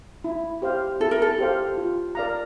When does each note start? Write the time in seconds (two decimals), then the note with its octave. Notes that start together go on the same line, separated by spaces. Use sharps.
0.24 E4
0.62 G4 C5 F5
1.00 E4 A4
1.11 A#4
1.22 A4
1.39 G4 C5 F5
1.77 F4
2.15 A#4 D5 F5 A#5